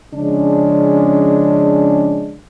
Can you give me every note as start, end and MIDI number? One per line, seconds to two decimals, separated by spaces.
0.14 2.37 49
0.14 2.37 53
0.14 2.37 56
0.14 2.37 61
0.14 2.37 62